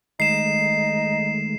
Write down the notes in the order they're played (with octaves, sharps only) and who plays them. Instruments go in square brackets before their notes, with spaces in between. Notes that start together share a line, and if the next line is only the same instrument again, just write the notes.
[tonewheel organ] D#3 G#3 A3 [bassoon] D#4 [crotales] C7 E7